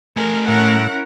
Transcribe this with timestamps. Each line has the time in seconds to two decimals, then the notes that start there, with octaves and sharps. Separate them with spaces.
0.17 A3 A#4 G#5
0.48 A2 C#4 E4 A#4 E5 F#5